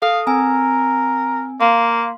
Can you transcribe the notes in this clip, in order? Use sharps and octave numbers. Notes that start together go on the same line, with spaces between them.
A4 F5 D#6
C4 A#4 G#5 E6
A#3 F5 C6